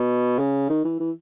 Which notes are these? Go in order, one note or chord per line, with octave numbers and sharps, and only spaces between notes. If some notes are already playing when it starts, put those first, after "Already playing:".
Already playing: B2
C#3
D#3
E3
E3